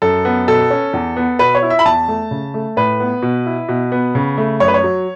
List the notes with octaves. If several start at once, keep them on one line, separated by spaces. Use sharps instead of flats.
F#2 A4
B3
B2 A4
C#4
E2
B3
B2 B4
C#5
E4
E5
B5
E2 A5
A3
C#3
A3
A2 B4
B3
B2
E4
B2
B3
C#3
A3
F#2 C#5
B4
C#5
F#3